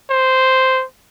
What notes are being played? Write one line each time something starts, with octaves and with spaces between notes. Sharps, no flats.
C5